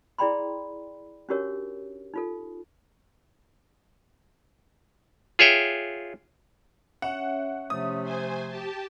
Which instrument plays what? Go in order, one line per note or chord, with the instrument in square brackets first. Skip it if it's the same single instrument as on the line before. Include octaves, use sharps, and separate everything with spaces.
[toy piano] E4 G#4 D5 G5 B5 C6
C#4 D4 F#4 G4 A#4 C#5
D#4 F4 A4
[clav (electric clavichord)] F4 G#4 C#5 E5 G5
[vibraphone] C#4 C#5 E5 [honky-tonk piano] F#5
[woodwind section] C3 F3 A3 [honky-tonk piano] D#6
[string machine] C5 G#5
G4 A5